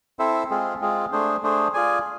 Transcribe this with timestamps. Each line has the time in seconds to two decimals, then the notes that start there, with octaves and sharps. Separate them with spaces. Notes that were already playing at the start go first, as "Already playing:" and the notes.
0.19 C4 E4 A4 C5 E5
0.50 G#3 C4 F4 G#4
0.81 G#3 C4 F4 G#4
1.12 A3 D4 G#4 C5
1.43 A3 D4 G#4 C5
1.74 F4 G#4 D5 G#5